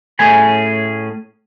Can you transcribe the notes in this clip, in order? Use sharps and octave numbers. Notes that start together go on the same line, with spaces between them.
A2 A3 C#4 G#4 G#5 B5